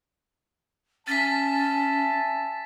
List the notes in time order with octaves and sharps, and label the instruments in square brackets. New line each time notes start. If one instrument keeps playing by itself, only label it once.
[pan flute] C#4 [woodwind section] E5 G#5 A5 [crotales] A6 B6